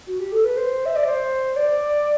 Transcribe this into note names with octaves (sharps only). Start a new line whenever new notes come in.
F#4
G4
A4
B4
C5
E5
D5
C5
D5